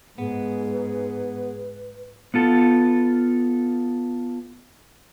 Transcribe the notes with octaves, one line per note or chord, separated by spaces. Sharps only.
G#2 B3 G#4 B4
B3 F4 A4